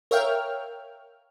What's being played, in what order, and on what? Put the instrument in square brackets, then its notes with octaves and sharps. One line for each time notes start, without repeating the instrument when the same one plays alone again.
[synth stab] A#4 C#5 E5 F5 G5 F6